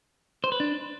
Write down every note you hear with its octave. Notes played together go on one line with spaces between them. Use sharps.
C5
B4
D4